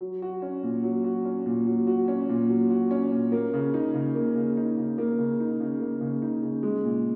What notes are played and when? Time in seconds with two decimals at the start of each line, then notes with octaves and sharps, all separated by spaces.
0.01 F#3
0.22 F#4
0.42 C#4
0.63 A#2
0.84 F#3
1.04 F#4
1.25 C#4
1.46 A#2
1.67 F#3
1.87 F#4
2.08 C#4
2.29 A#2
2.49 F#3
2.70 F#4
2.91 C#4
3.12 A#2
3.32 A#3
3.54 C#3
3.74 D#4
3.94 C#3
4.15 A#3
4.35 C#3
4.57 D#4
4.77 C#3
4.98 A#3
5.18 C#3
5.40 D#4
5.60 C#3
5.80 A#3
6.01 C#3
6.22 D#4
6.43 C#3
6.63 G#3
6.84 A#2